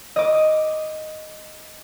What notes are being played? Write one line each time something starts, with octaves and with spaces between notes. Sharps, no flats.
D#5 D6